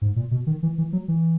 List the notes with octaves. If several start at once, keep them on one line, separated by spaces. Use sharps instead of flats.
G#2
A#2
B2
D#3
E3
E3
F#3
E3